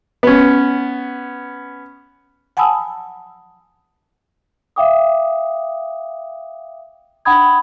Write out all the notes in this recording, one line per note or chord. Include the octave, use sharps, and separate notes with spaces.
B3 C#4
F#5 G#5 A5 B5 D#6 E6
E5 F5 G5 D6 D#6
D4 F#5 G5 B5 D#6 G#6